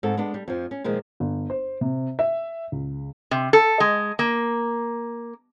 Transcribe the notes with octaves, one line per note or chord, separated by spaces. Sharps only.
G#2 C4 D#4 A4
G#3 B3 D4
G3
F2 F3
C#4
A#2 D#3 F3 G#3
G1
C5
C3
E5
C#2
C3
A4
G#3
A#3